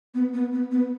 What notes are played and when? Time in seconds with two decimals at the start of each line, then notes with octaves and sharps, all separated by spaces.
0.14 B3
0.33 B3
0.52 B3
0.71 B3